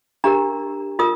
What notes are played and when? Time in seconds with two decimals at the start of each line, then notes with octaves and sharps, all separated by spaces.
0.24 D4 G4 A#4 A#5
0.99 F4 A#4 D#6